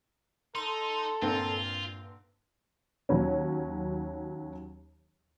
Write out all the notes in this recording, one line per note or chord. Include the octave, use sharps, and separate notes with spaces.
D#4 A4 C6
G2 A#2 D3 C4 F4
D#2 F#3 C#4